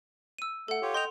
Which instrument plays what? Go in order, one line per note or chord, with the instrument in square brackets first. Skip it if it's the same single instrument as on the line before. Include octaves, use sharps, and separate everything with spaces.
[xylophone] E6 D#7
[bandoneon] A3 [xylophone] A4 F#5
[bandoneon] F4 G4 C#5
[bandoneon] D#5 G5 G6 [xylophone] C6 F7